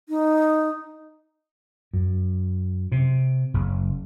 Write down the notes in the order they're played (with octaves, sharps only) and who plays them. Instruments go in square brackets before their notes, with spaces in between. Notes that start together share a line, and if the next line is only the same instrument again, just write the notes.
[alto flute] D#4
[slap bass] F#2
C3
F#1